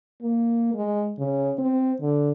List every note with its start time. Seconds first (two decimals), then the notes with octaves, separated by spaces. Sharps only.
0.23 A#3
0.74 G#3
1.19 C#3
1.59 C4
2.01 D3